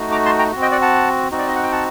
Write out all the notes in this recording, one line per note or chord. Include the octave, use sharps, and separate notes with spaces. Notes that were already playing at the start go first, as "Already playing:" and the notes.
Already playing: A3 D#4 F#4
A#5 D6
A5 C6
G5 A#5
C4 F#4
D#5 G5
D5 F#5
F#5 A5
C4 D#4 F#4
D5
D#5
F#5
G5
F#5 A5